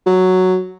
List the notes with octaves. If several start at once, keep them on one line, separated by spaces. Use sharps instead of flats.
F#3